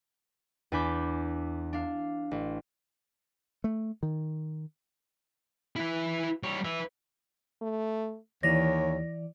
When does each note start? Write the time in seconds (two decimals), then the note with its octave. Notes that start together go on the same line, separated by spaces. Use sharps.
0.72 E2 D4 G#5 B5 D6 G6
1.73 D4 F5
2.31 A1
3.64 A3
4.03 D#3
5.76 E4 B4
6.43 G3 C#5
6.65 B4 E5
7.62 A3
8.43 D#2 E3 C#5 D5 A#6